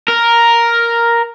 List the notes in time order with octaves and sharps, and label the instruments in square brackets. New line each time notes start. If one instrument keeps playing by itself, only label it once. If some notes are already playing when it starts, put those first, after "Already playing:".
[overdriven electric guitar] A#4